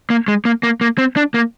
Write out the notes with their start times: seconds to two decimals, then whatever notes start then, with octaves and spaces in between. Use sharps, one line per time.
0.10 A#3
0.28 G#3
0.45 A#3
0.63 A#3
0.81 A#3
0.98 C4
1.16 D4
1.34 A#3